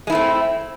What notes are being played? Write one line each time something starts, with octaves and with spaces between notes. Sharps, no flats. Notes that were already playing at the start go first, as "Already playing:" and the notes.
G#3 A3 C4 E4